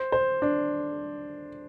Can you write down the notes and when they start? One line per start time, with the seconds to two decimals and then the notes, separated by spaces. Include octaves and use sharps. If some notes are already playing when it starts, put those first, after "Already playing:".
Already playing: C5
0.12 C5
0.42 D4